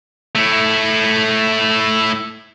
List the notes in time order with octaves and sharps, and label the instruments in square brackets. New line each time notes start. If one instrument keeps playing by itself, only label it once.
[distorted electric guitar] A3 E4